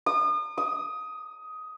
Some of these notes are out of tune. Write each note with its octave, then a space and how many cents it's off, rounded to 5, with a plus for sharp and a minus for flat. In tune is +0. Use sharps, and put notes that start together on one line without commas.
D#6 -40
D#6 +15